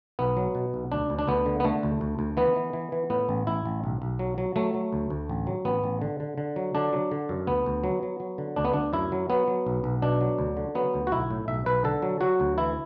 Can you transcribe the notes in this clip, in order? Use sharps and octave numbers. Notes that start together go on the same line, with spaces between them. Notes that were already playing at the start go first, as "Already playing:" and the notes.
B1 B3
F#3
B2
B1
D2 D4
D2
D4
D2 B3
D3
B3
D3 A3
D2
D2
D2
E3 B3
E3
E3
E3
A2 B3
A1
A1 E4
A1
B1
B1
F#3
F#3
F#3 A3
F#3
D2
D2
A1
F#3
A1 B3
A1
D3
D3
D3
F#3
D3 D4
F#3
D3
F#2
D2 B3
D2
F#3
F#3
F#3
D3
D2 D4
B3
D2 D4
F#2 E4
F#3
F#3 B3
F#3
B1
B1
B2 D4
F#3
D2
D3
F#3 B3
D2
F#4
B1 E4
A2
B1 E5
B1 B4
D3 A4
F#3
F#3 F#4
D2
E3 E4